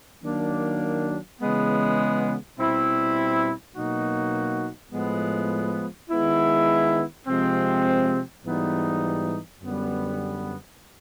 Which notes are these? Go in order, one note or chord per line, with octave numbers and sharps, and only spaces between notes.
D#3 F#3 A#3 D4
C#3 E3 G#3 B3
B2 G3 C4 E4
B2 F#3 A#3 D#4 F#4
A2 F3 G#3 B3
D#3 G#3 B3 E4
C3 F3 G#3 C4
G#2 E3 G3 B3 D#4
F#2 D3 G3 B3